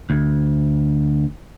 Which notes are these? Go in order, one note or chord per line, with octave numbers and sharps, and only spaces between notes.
D2